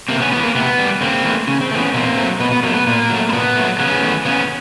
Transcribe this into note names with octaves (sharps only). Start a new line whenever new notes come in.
C3 A#3 C4
B3 C#4
G3 B3
E3
A#3
C3 B3
E3 G3
C#3 A#3 C4
E3 A3
C#3 C#4
C4
E3 A3 B3 C#4
B2 A#3 C4
F#3 A3
B2 B3
B3
F#3 A3 A#3 C4
B3
A#2 A#3
F#3 A3
C4
A#2 B3
F#3 A3
C#3 B3 C#4
E3 A3
C#3 B3 C#4